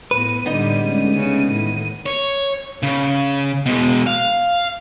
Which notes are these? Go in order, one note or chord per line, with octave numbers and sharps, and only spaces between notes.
A2 B3 B4 D#7
A2 D3 G3 B3 D#4 D#5
G#3 A3 C#4
C#3
A2 D#3
C#5
C#3
B2 G#3
F5